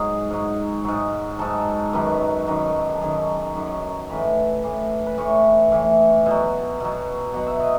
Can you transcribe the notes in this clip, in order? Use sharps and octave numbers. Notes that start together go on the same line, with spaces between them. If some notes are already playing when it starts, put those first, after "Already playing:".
Already playing: G#2 F#3 G#4
G#2 F#3
G#2 F#3
G#2 F#3 A4
F#2 D#3 F#3 B4
F#2 D#3 F#3
A4
F#2 D#3 F#3 G#4
F#2 D#3 F#3
A2 E3 B4
A2 E3
B4
A2 E3 C#5
A2 E3
B2 F#3
B2 F#3
B2 F#3 F#5
E5
D#5